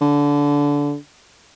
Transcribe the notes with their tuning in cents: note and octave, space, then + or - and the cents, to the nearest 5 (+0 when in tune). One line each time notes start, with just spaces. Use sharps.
D3 -20